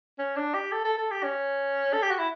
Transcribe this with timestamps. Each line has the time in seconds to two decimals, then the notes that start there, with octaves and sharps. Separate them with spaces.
0.18 C#4
0.36 D4
0.54 G4
0.72 A4
0.85 A4
0.98 A4
1.11 G4
1.24 C#4
1.93 A4
2.02 G4
2.11 F#4
2.18 E4